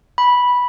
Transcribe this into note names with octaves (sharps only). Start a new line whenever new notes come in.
B5